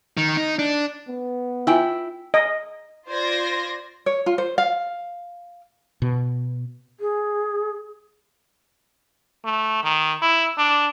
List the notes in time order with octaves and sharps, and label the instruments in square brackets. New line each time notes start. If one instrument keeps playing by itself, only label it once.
[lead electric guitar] D#3
D#4
D4
[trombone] B3
[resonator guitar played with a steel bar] E4 G5 [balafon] F4 G#5
[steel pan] D#5
[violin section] F4 C5 D5 C6 G#6 A#6
[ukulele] C#5
F4
C5
F5
[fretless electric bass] B2
[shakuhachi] G#4
[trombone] A3
D#3
E4
D4